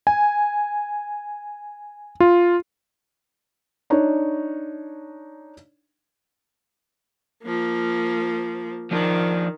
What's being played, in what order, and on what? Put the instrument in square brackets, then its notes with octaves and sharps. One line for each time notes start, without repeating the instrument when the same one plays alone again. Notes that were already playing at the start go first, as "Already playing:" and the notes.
[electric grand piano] G#5
F4
[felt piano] D4 D#4 C#5
[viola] F3 A#3
[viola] D#3 [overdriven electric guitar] F3 D4